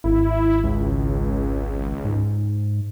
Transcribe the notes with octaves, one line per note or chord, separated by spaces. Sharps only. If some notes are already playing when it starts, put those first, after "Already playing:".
G#1 E4
C#2
G#2